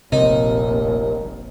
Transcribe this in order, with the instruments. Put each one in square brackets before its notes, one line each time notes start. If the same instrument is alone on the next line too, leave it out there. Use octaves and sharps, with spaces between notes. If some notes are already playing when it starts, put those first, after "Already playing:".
[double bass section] F1 A#1 [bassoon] D#2 [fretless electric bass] C3 [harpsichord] D#4